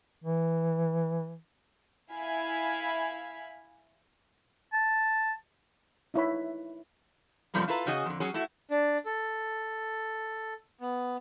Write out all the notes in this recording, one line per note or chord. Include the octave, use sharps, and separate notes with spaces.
E3
E4 F5 G#5 B5
A5
D#4 E4 C#5 B5
F#2 C3 F3 G3 A3 A#3
E4 F4 A4 B4 A#5
C#3 C#4 F#4 G#4 D#5
F2 D3
F#3 C#4 G#4
A3 E4 F#4
D4
A4
B3